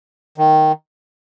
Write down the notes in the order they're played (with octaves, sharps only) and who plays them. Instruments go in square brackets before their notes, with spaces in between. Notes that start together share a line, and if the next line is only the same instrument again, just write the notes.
[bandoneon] D#3